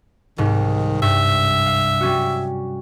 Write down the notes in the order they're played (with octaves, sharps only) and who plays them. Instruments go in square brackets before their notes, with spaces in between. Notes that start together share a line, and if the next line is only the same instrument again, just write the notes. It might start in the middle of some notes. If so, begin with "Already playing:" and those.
[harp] C2 G#2 [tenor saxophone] D#3
[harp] G2 [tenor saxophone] E5
[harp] F5
G3 C#4 F#4